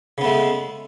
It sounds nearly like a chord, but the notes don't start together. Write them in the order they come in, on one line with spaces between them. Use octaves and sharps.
C#3 B3 A3 G#3